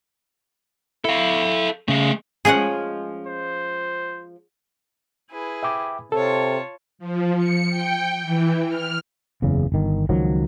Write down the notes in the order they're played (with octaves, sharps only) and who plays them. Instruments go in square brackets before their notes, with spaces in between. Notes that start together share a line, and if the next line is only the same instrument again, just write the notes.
[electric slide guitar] E4 [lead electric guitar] A4 F5
[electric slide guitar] C#3 [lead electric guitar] A3 G#4
[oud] F3 G#3 C#4 [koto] G#4 F#5
[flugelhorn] C5
[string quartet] E4 G#4 B4
[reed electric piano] E5 G5 D6
[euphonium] C3 [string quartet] F4 C#5 A5 [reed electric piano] A4
[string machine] F3
C#7
G5
E3
F6
[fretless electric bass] F#1 E2 C#3
G1 D#3
C#2 D#3 F3 F#3